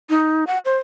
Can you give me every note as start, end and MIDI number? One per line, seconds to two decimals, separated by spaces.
0.10 0.44 63
0.47 0.58 78
0.65 0.77 72